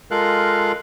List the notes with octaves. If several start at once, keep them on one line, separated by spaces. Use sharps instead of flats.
G#3 F4 A4 A#4 F5 F#6